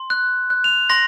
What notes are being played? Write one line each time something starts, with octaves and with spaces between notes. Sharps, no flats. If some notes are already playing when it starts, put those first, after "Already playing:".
Already playing: C6
F#6
F#6
F7
C6 A#6